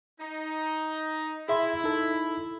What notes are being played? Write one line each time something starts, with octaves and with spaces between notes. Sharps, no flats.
D#4
E4 G#4 E5 C6
D#4 A4